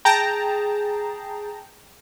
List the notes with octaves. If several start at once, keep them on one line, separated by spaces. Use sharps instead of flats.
G#4 G5 A5 A#5